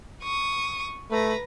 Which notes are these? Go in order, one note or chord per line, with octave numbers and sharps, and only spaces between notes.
C#6 D#6
A3 B4 A#5